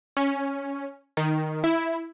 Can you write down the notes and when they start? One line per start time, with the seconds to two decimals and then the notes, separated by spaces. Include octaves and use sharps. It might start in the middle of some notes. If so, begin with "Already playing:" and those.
0.17 C#4
1.17 D#3
1.64 E4